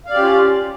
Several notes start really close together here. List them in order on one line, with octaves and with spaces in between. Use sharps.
F5 D5 G4 C#4 F4